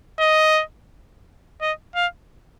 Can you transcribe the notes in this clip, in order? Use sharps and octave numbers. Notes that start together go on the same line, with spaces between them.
D#5
D#5
F5